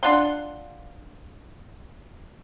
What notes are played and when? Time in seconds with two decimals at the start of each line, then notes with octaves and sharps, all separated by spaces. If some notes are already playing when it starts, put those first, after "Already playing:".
0.03 D4 F4 F#5 C6